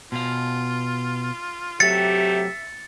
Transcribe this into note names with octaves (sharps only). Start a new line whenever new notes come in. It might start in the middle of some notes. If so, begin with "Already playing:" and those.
B2 F4 F5
C3 F#3 A3 G4 E5 A6 C#7